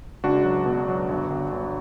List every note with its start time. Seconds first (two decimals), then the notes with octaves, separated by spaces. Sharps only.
0.24 C#2 D4 F#4
0.45 F#3
0.66 B2
0.88 F#3
1.09 G1
1.30 G1
1.52 G1